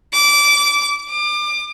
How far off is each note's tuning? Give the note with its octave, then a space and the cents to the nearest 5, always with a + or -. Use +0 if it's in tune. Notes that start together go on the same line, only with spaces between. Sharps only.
D6 -20
D6 +30